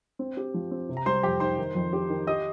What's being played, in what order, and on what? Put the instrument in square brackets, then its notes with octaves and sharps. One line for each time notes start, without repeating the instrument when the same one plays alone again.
[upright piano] C4
G4
F3
C4
C3
[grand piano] A#5
[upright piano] G3 [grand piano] C5 C6
[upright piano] F2 [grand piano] G4 G5
[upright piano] D#4 [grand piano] C5 C6
[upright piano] D#3
F2
G4
D#3
[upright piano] G4 [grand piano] D#5 D#6